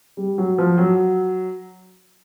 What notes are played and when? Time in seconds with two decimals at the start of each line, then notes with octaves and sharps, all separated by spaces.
0.17 G3
0.38 F#3
0.58 F3
0.78 F#3